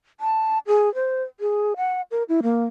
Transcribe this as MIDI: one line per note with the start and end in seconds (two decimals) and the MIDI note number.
0.20 0.59 81
0.67 0.93 68
0.95 1.22 72
1.40 1.74 68
1.77 2.01 78
2.11 2.23 70
2.29 2.41 64
2.43 2.66 58